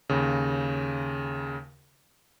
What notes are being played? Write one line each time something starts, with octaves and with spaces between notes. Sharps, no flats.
D#2 C#3